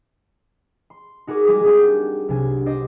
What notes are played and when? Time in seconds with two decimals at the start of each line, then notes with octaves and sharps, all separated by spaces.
0.90 C6
1.27 D#4 F#4 G#4 A#4 D6
1.46 G3 G#3 G#4 G#5 A#5 D6
1.64 G3 C4 D4 F#5 G#5 G6
2.29 C2 C3 F#3 D4 G#5
2.66 D4 C5 D5 D#5